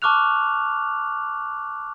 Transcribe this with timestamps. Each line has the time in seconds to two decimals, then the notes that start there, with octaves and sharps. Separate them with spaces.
0.02 A5 C#6 D6 F6 F#6 F7